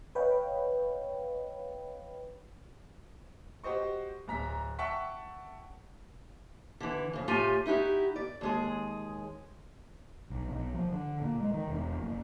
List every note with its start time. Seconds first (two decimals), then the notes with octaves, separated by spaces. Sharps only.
0.15 B4 C#5 D#5 F5 G5 B5
3.64 F#4 G4 C5 D#5 C#6
4.28 D1 A#5 B6
4.79 E5 F#5 G5 A5 C#6 B6
6.80 D3 E3
7.13 F2 C#3
7.28 A2 F4 G4 G#5
7.66 D#4 E4 F#4 G4
8.16 D5
8.41 D#2 G#3 G#4
10.30 B1
10.51 B1
10.74 F3
10.92 D3
11.22 A#2
11.40 G#3
11.54 D#3
11.67 E1
12.02 F#1